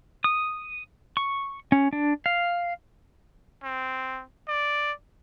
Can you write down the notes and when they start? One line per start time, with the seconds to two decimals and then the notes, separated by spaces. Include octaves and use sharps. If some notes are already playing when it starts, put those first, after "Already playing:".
0.24 D#6
1.17 C#6
1.72 C#4
1.93 D4
2.26 F5
3.63 C4
4.48 D5